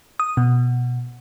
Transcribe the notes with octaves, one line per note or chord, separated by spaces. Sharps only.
D#6
B2